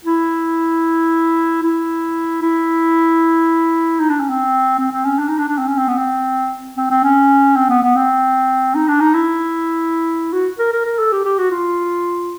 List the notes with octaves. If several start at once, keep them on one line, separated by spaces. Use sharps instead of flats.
E4
E4
E4
D#4
D4
C#4
C4
C4
C4
C#4
D4
D#4
D4
D4
C4
C#4
C4
B3
C4
C4
C4
C#4
C4
B3
B3
C4
D#4
D4
D#4
E4
F#4
A#4
A#4
A#4
A4
G4
G4
F#4
F4